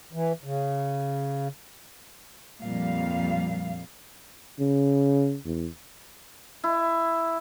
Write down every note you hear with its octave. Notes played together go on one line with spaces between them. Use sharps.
E3
C#3
F2 A#2 G3 F5
C#3
E2
E4